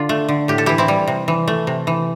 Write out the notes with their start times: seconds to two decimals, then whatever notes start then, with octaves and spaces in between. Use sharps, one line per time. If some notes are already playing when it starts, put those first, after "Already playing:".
Already playing: D3 D4 F4
0.09 A3
0.28 D3
0.48 A2 G4
0.58 A4
0.66 E3 E4 G4
0.78 C4 E4
0.88 G3
1.07 C3
1.28 E3
1.48 A3
1.67 C3
1.87 E3